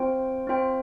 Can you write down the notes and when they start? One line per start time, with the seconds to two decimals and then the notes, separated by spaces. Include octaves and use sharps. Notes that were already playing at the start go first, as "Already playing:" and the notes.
Already playing: C4 F4 C5 G5
0.47 C4 F4 C5 G5